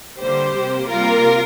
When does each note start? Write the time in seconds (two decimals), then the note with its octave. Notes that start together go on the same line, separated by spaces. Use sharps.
0.20 D3 G3 A#3 G4 C5
0.55 C3 A#3
0.89 C3 G3 A#3 F4 A#4